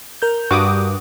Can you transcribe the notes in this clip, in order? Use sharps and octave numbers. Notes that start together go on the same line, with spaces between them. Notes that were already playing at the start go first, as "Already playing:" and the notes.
A#4 G6
G2 F#4 D6 D#6